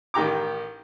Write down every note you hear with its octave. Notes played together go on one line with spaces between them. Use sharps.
A1 D#3 G4 A#5 D6